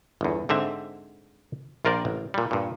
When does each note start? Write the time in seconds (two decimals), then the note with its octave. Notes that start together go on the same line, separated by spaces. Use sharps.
0.21 G1 E2
0.49 G#2 D3 C4 E5
1.85 A#1 F4 A#4 C5 D5
2.05 A1
2.34 A#2 G3
2.51 G2 A#2